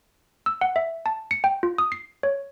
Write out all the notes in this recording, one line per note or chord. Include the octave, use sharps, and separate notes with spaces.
E6
F#5
E5
A5
C#7
G5
F4
D#6
C7
C#5